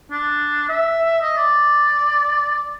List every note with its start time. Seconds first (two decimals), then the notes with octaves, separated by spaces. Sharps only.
0.11 D4
0.69 E5
1.21 D#5
1.37 D5